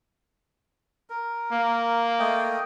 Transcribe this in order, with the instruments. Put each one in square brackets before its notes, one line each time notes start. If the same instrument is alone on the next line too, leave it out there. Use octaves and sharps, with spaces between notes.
[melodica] A#4
[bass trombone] A#3
[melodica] A3 D#5 G5